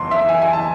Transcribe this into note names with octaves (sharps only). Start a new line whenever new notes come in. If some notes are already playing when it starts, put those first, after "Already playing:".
Already playing: F#1 E2 C6
E5
G#5
G#5
A5